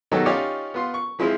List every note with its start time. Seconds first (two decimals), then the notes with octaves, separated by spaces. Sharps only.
0.11 B2 D#3 F#3 D#4 G4 A4
0.26 C#4 D#4 F4 G4 C#5 D5
0.74 B3 F4 C6
0.94 C#6
1.19 E3 F3 G#3 C4 E4 F4